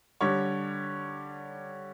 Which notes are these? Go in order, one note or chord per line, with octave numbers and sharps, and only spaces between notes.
D3 G3 C#5